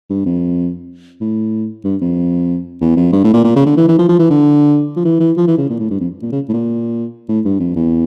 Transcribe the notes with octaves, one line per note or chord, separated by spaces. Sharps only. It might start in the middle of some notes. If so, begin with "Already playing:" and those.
G2
F2
A2
G2
F2
E2
F2
G2
A2
A#2
A#2
C#3
D3
E3
E3
F3
F3
E3
D3
F3
E3
E3
F3
E3
C#3
A#2
A2
G2
F2
A#2
C#3
A2
A#2
A2
G2
F2
E2